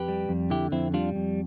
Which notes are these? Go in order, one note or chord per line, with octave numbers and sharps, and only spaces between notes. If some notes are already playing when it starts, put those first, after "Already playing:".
Already playing: F2 G4 B4
G3
F2
D3 E4 G4
F2 C4 E4
G3 D4 F4
F2